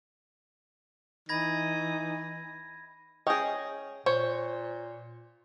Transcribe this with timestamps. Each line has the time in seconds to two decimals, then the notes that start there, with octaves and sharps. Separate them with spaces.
1.29 E3 D#4 B5 G#6 A#6
3.27 C#4 G#4 D#5 G5
4.06 A#2 C5 C#5